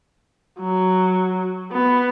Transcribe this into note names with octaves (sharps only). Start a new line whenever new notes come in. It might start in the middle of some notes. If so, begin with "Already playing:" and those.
F#3
B3